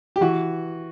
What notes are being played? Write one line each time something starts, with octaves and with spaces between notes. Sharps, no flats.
G4
E3 F#4